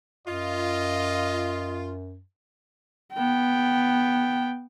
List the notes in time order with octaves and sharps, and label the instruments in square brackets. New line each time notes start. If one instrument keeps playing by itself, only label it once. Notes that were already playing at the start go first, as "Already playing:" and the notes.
[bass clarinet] F#2 [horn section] F4 [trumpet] D#5
[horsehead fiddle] B3 G5